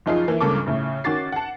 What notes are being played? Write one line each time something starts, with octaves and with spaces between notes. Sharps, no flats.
F#1 F3 D#4 F4 G#4 C7
E3 A#3 E4
C#2 G2 C#3 A#3 A4 D6
A2 C#3 A3
D#3 C#4 F#4 D6 A6 C7
F#5 A5